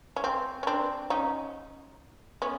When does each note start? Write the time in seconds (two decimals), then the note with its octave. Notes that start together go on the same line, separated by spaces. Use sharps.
0.16 C#4
0.24 C4
0.63 C#4
0.67 C4 D4
1.10 C#4 D#4
2.42 B3 C#4